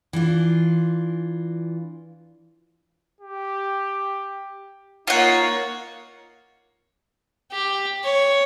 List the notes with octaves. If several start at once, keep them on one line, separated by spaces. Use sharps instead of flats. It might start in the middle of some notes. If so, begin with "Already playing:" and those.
E3 D4 F4
G4
A#3 D#4 F4 C#5 F#5
G4
C#5